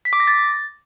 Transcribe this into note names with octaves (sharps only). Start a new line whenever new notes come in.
B6
D6
A#6
A6